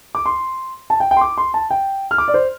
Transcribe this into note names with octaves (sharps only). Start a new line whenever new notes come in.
D6
C6
A5
G5
G5
C6
D6
C6
A5
G5
F6
D6
D5
C5